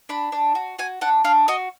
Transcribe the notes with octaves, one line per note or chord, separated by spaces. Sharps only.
D4 B5
D4
F#4
F#4 G#5
D4 F#5
D4 F5
F#4 D#5